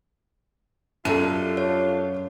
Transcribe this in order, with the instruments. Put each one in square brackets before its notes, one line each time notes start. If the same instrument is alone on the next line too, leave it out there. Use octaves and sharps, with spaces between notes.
[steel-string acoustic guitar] F#2 [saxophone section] G3 D4 F4 [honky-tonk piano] A4 D#7
[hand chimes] C#5